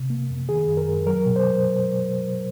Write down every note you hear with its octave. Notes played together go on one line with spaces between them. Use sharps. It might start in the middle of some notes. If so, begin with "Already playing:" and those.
Already playing: C3
A#3
F2
D#3 G#4
F#2
A#4
F#2
F#3 A#4
B2
C5
B2